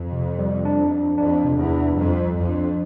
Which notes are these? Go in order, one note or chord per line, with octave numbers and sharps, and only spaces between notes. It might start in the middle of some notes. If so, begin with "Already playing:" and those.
Already playing: F2
C3
G3
D4
D4
F2 D4
C3
E2
D4
F2 G3
C2
F2
D4